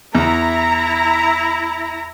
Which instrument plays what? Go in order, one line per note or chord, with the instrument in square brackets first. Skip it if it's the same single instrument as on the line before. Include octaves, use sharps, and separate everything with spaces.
[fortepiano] E2 [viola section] E4 A#5